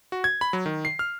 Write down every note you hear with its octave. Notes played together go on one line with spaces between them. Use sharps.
F#4
G#6
B5
F#3
D#3
C7
F6